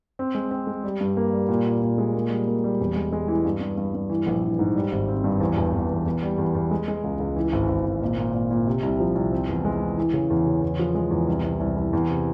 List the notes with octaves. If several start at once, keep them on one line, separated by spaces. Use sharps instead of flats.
C4
G#3
C4
G#3
G3
G2
A#3
G3
A#2
A#2
A#2
G#3
A#3
G3
A#3
G3
E1
G#3
G#3
E3
G2
G2
G2
G2
E3
A#1
E3
G#2
G3
G#1
C4
G2
E2
E1
E2
E2
E2
G3
E2
E2
G#3
G#3
C#2
C#2
E3
G#1
G#1
G#1
A#2
A#2
A#2
A#2
C3
C2
F3
C2
C4
E2
G#3
E3
E3
C#3
E2
C#3
E2
F3
G#3
E2
C2
C2
C2
C2
E2
C3